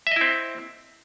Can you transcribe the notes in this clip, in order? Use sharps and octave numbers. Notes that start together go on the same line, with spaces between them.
C4 E4 D#5 E5